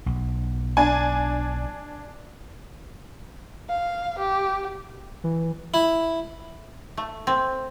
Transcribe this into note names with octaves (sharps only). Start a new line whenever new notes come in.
B1
D4 G#5
F5
G4
E3
E4
A3
C4